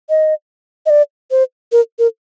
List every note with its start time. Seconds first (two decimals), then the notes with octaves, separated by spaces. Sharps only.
0.10 D#5
0.86 D#5
0.90 D5
1.31 C5
1.72 A#4
1.99 A#4